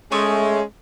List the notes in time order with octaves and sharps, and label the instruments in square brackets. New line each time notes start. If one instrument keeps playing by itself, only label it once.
[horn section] G#3 C#4 [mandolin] A3 C#6 D#6